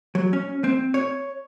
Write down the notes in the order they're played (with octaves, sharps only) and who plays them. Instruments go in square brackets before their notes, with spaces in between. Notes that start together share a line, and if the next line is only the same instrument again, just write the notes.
[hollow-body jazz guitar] F#3
C#4
C4
C#5